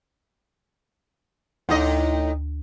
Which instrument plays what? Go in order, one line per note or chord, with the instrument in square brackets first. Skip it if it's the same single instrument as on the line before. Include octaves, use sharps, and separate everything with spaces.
[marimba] D2 [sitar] A2 D#4 D#5